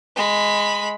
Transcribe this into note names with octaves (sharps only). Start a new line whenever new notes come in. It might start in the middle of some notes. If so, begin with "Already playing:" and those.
G#3 B5